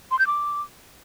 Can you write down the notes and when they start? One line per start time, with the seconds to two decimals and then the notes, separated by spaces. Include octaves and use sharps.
0.11 C6
0.19 G6
0.27 D6